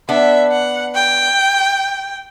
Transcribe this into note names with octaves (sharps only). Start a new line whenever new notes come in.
B3 D4 E5
F#5
G5